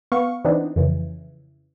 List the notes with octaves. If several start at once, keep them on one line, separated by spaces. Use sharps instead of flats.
B3 F5 C#6
E3 B3 C4 D4 D#4
F2 C#3 E3